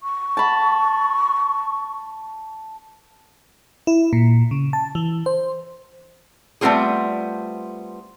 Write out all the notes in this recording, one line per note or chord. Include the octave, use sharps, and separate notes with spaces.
C#6
A5 B5
E4
A#2
C#3
A5
E3
C5
G3 A3 B3 C4 F4 G#4